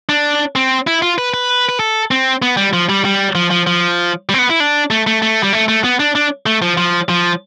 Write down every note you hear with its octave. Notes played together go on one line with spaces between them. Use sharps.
D4
C4
E4
F4
B4
B4
B4
A4
C4
B3
G3
F3
G3
G3
F3
F3
F3
G3
C4
B3
E4
D4
A3
A3
A3
G3
A3
A3
B3
D4
D4
A3
F3
F3
F3